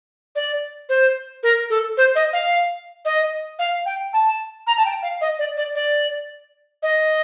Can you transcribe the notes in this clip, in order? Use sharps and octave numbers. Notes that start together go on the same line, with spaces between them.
D5
C5
A#4
A4
C5
D#5
F5
D#5
F5
G5
A5
A#5
A5
G5
F5
D#5
D5
D5
D5
D#5